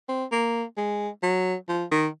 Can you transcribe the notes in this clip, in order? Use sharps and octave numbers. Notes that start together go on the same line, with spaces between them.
C4
A#3
G#3
F#3
F3
D#3